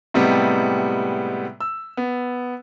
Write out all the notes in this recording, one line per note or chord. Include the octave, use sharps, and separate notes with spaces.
A2 C3 G3 G#3 B3
E6
B3